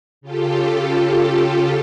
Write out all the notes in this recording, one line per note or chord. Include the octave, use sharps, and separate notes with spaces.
C#3 F4 G4 A4